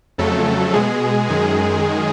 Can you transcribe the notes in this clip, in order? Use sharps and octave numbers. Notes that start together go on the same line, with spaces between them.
F2 C#3 F#3 A3 A4
B2 G#3 G#4
F#2 D#3 G#3 G#4